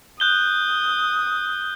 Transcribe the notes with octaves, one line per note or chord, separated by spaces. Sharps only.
D#6 F#6 G6 G7